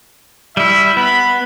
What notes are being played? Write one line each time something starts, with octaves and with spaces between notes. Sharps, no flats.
G3 E4 E5
B3 B5